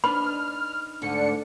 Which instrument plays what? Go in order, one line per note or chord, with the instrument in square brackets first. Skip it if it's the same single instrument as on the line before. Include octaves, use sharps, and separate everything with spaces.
[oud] D4 D#4 B4 [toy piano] B5 [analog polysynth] F6
[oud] D2 G#2 D3 [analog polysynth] D4 C#7